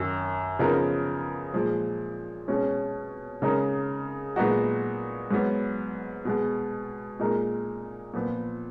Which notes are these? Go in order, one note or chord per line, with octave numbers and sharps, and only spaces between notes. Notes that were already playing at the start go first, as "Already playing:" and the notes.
Already playing: F#2 D#3 F#3
C#3 F3 B3 D#4 A#4
A#2 F3 G#3
B2 G#3 C#4
C#3 G#3 D#4 A#4
A#2 G#3 B3 D#4 F#4
G#2 F#3 B3
B2 G#3 B3
A#2 G#3 D#4 A#4
A#2 F3 B3